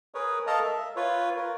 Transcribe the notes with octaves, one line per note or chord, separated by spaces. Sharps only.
G#4 A#4 B4 C#5
A4 A#4 D#5 F5 A5 A#5
E5
F4 B4 C#5
A#4